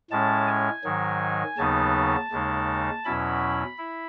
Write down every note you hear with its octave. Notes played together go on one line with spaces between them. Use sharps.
A2 G#3 C#4 A5
G#5
G#2 D#3 F#3
D#2 C#3 F#3 B3 D#4 A5
D#2 C#3 G#3 D#4
E2 B2 F#3 C#4 E4 B5
E4